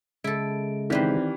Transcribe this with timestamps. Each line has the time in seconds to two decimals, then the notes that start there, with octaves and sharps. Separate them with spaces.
0.24 C#3 G#3 E4 A4 D7
0.90 D#3 E3 C4 G4 B4 C5 D5